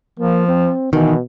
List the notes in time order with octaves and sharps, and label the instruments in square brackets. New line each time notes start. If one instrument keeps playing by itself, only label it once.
[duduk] F3 [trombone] A#3
[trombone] C4
[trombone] B2 [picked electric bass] D#3 [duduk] E3